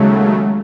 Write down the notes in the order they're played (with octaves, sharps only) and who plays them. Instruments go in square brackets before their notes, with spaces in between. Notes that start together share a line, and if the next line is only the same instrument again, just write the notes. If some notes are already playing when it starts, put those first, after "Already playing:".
Already playing: [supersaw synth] D#2 C#3 F#3 A3 [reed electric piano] G#3